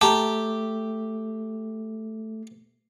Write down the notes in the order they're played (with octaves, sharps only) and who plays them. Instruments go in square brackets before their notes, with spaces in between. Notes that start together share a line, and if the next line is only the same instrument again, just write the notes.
[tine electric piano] A3 [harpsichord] G4 [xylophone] A5 A#5